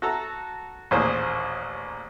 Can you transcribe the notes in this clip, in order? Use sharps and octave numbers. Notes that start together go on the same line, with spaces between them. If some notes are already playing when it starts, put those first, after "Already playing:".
F#4 A4 A#5
A1 D#2 A#2 G#4 C5